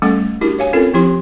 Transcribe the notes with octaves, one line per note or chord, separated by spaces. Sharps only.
G3 A3 C#4 A4 F#5
D4 E4 F#4 G4 A#4
C#5 F5 G#5
C4 C#4 F4 A4 A#4
F3 C4 E4 G4 C6